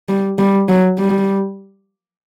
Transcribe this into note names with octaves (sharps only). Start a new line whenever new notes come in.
G3
G3
F#3
G3